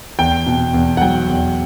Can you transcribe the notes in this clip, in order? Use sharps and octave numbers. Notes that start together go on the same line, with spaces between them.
E2 G5
B2
E2
F#5
F#3 G5
E2